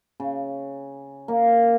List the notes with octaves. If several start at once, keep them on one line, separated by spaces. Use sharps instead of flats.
C#3
A#3